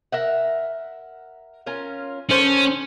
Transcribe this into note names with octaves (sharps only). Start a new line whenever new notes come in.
A#4 E5 F#5
C#4 F4 A#4
D#3 C#4 A4 C5